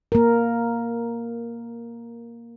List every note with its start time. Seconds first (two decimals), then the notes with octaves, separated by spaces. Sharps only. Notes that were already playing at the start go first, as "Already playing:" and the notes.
0.12 A#3 A#4